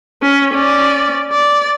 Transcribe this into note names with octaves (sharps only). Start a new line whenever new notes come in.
C#4
C#4 D5
D5